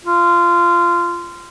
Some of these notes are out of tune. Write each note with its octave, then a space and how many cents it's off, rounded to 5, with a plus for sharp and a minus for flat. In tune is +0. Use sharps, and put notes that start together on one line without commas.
F4 -20